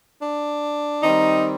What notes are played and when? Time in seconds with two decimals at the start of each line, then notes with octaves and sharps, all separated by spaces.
0.21 D4
1.03 D#3 G3 C4 D#4